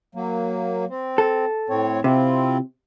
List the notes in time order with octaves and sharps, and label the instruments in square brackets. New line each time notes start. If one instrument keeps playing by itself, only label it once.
[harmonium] F#3 A#3
C4
[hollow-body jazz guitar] A4
[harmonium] A2 C4 C#5
[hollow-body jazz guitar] C3 [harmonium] C4 E4 F4